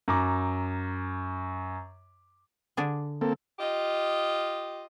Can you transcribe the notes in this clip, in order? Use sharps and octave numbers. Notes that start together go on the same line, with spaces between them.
F#2 A#5 D6
D3 D4 G#4
A#3 C4 A4
F4 G4 D#5